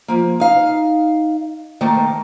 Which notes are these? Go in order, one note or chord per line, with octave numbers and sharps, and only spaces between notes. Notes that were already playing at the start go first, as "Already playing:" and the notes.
F3 A#3
D#4 F5
D#3 A3 A#3 A4